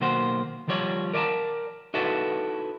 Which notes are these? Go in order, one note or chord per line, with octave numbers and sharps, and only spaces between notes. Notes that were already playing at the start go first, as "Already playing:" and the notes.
B1 D#3 A#3 F#4 C5 F#5
D#3 F3 G3 C#5 D5
A#4 D5 D#5 A5 A#5
D#4 E4 F#4 A4 B4 D5